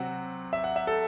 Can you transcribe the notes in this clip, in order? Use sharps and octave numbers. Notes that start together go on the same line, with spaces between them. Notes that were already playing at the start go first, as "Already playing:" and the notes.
Already playing: C3 F#3 C4 F#5
E5
F#5
E5
A4